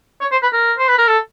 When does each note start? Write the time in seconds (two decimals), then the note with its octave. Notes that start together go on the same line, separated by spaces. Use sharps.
0.21 C#5
0.32 C5
0.43 B4
0.53 A#4
0.78 C5
0.88 B4
0.98 A#4
1.08 A4